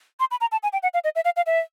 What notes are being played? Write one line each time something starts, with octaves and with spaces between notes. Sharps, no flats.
C6
B5
A#5
A5
G#5
G5
F#5
F5
D#5
E5
F5
F5
E5